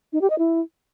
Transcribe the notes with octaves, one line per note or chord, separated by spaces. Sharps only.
D#4
G4
D#5
E4